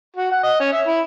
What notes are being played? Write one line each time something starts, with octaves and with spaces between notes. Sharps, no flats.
F#4
F#5
D#5
C#4
E5
E4